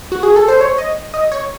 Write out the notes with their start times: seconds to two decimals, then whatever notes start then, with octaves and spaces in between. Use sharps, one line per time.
0.12 F#4
0.23 G#4
0.36 A4
0.48 C5
0.61 C#5
0.78 D#5
1.14 D#5
1.32 C#5